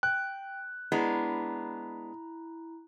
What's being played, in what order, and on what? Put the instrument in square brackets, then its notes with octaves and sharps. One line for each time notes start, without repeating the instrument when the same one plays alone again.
[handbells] G5 [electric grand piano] F#6
[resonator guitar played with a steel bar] G#3 B3 D4 [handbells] E4 A#5